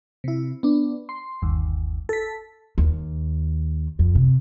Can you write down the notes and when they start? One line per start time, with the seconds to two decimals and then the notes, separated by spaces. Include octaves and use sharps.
0.24 C3 E4
0.63 B3 D4
1.09 C6
1.42 G1 D#2
2.09 A4 B6
2.78 D#2
3.99 F2
4.15 C3